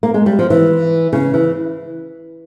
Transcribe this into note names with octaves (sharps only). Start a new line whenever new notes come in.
A#3
G#3
G3
F3
E3
C#3
E3